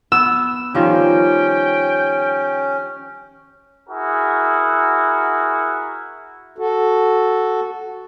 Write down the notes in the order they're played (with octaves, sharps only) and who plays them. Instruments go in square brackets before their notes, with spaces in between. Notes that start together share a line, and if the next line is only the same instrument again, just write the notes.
[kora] B3 [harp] E6
[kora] D#3 F3 G3 [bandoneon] C#4 [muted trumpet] G5
[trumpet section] E4 F#4 G#4 A#4
[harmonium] F#4 A4